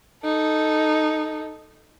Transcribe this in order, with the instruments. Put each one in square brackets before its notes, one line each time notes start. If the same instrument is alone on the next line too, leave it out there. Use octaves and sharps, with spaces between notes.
[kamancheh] D#4 A4